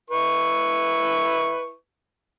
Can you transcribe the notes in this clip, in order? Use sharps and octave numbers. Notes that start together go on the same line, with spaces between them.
E4 B4 C#6